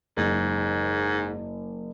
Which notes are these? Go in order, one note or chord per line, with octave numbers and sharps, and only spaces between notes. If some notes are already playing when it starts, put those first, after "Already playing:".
F#1 G#2